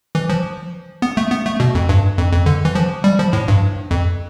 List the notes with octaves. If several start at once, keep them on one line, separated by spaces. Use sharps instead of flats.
E3
F3
B3
A3
B3
A3
B2
F2
G2
F2
F2
D3
E3
F3
G3
F3
A2
G2
F2